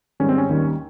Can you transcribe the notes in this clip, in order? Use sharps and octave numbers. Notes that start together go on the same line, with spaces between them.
G#2 D#3 G3 C#4
C4
C#4
D#2 D#3 G3